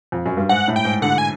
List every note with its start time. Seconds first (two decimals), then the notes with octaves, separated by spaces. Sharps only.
0.12 F2
0.26 F#2
0.37 G2
0.49 G#2 F#5
0.68 A2
0.76 G5
0.85 G#2
1.02 D3 F#5
1.18 G#5